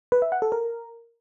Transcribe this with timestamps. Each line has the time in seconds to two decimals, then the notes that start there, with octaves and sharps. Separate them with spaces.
0.12 B4
0.22 E5
0.32 F#5
0.42 A4
0.52 A#4